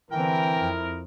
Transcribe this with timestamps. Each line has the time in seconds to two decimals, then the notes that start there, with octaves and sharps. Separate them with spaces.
0.11 D3 E3 C4 E4 A#4 G5
0.58 F2